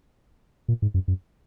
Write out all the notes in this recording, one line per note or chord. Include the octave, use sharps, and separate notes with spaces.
A#2
G#2
F#2
F#2